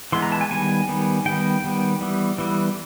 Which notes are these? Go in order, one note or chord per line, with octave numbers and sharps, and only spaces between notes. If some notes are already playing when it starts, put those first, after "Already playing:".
E3 G#3 B3 C6
A#5
A5
G#5
D#3 G3 B3 G#5
D#3 G3 B3
D#3 G3 B3 G5
D#3 G3 B3
E3 G3 B3
E3 G3 B3